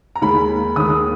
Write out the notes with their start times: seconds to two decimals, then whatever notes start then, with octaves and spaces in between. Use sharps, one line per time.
0.16 A#5
0.21 D#2 D#3 G#3 B5
0.76 D#2 D#3 G#3 D#6